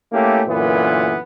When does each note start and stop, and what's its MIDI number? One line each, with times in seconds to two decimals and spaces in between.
0.13 0.42 57
0.13 0.42 58
0.13 0.42 61
0.13 0.42 64
0.13 0.42 67
0.46 1.17 42
0.46 1.17 46
0.46 1.17 50
0.46 1.17 52
0.46 1.17 59